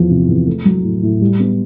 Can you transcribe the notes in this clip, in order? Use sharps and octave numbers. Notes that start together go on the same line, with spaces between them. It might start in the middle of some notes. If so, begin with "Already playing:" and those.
Already playing: E2 F3
C3
E2
A3
F#3
A2
A2
G3
B3